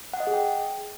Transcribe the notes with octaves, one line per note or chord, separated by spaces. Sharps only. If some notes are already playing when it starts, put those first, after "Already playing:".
F#5
D#5
G#4
G5